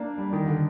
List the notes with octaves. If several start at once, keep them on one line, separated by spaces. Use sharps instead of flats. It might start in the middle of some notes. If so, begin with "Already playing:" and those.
Already playing: A#3 D4
G3
D#3
D3